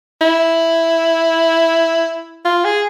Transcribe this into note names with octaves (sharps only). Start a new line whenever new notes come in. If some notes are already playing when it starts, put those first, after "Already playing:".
E4
F4
G#4